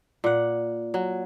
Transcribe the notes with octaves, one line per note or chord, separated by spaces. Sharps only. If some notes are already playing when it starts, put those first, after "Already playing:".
A#2 F#5
F#3